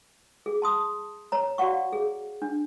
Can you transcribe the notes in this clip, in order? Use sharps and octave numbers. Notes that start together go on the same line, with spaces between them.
G#4
A5 C6 D#6
C#5 A#5
F#4 D5 F5 F#5 C#6
G#4
D4